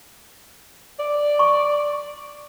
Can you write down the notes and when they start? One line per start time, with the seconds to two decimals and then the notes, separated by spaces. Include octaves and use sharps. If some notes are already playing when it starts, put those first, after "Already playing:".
0.99 D5
1.39 C#6